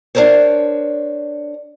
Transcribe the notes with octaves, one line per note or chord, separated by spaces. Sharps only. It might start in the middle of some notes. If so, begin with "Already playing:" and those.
D4 F4 A#4 C5 C#5